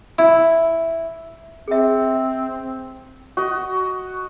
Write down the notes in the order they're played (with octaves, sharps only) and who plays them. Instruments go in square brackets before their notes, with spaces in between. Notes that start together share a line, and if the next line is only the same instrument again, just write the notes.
[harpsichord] E4
[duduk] C4 [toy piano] G#4 E5
[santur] F#4 D#5